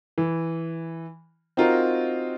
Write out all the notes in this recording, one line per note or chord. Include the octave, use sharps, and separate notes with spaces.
E3
C4 D#4 F4 F#4 A#4